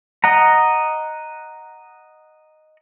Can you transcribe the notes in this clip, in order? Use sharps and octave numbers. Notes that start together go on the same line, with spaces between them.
D#5 F#5 A#5